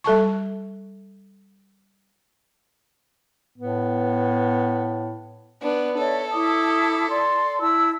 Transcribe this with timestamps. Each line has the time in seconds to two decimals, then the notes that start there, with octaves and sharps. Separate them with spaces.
0.04 G3 A4 A5 C#6
3.58 A2 B3
5.62 B3 D4
5.98 A4 C#5 D5 E5
6.33 E4 D6 D#6
7.10 D5 C6
7.61 E4 A5 E6